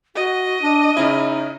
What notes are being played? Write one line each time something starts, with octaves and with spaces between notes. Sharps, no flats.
F#4 D#5
D4
C#3 C#4 D#4 E4